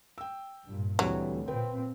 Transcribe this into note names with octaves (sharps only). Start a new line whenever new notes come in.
G5 E6
G2 A#2
D2 E3 F#3 G3 C4
A#2 C4 B4 G5